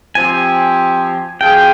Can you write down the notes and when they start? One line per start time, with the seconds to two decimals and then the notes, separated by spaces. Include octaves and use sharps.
0.15 F3 C4 G4 G#5
1.40 F3 C4 F4 G#4 G5